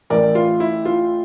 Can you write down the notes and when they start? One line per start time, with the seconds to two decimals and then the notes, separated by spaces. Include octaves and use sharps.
0.10 A1 A2 E3 A3 A#4 D5
0.35 F4
0.60 E4
0.85 F4